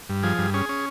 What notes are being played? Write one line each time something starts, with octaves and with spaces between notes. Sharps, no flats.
G2
F3 G#4
G2
C#4 G#4
C#4